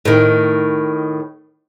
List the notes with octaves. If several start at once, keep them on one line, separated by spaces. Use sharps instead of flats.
A2 D#3